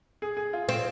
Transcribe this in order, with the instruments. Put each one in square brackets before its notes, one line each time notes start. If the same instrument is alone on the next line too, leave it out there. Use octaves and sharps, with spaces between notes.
[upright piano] G#4
G#4
F4
[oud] C4 [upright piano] F4